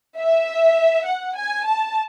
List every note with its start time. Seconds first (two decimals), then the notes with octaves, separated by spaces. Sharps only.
0.17 E5
1.06 F#5
1.36 G#5
1.65 A5